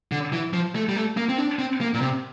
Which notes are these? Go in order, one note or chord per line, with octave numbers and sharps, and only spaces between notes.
D3
E3
F3
A3
G3
A3
A#3
C4
D4
C4
A#3
A#2
C3